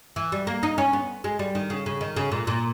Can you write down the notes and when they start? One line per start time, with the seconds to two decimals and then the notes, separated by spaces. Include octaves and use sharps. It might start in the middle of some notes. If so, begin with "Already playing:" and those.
0.16 E3
0.32 G3
0.47 A#3
0.63 D#4
0.78 C#4
0.93 B3
1.24 G#3
1.39 G3
1.55 D#3
1.70 C#3
1.86 C#3
2.01 D#3
2.16 C#3
2.32 A#2
2.47 A#2